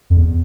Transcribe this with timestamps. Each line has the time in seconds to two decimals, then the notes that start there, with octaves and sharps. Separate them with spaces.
0.10 F2
0.17 E2